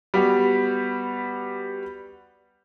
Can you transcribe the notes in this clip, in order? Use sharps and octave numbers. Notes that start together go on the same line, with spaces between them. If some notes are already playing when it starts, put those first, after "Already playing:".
G3 B3 F#4 G4